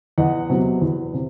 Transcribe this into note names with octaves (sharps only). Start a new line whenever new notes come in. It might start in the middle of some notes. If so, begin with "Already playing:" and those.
E2 D#5 F#5
C3 F#3 B3
E2
C3